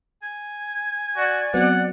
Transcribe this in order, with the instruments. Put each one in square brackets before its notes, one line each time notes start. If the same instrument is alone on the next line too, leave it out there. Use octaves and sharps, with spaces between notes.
[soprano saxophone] G#5
[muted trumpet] F#4 [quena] D5
[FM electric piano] F#3 B3 C4 [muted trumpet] F#5